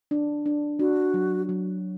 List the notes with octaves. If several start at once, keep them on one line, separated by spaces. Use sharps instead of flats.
D4
D4
D4 F#4
F#3
F#3